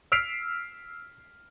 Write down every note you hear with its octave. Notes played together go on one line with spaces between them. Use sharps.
E6 F6 B6 C7 D7 F7